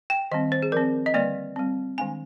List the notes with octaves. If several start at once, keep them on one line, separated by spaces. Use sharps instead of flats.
G5
D#3 G3 C4 D#5
C5
G#4
F3 C4 A#4
D#5
D3 G3 A#3 D5
G3 C4
D#3 G#3 D4 G#5